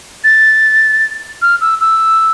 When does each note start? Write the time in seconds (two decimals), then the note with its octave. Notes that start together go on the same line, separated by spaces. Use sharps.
0.24 A6
1.42 F6
1.61 E6
1.81 E6